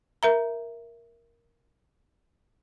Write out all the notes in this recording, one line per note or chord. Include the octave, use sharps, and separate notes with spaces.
A#4 E5 A#5